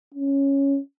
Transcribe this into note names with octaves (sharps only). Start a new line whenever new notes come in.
C#4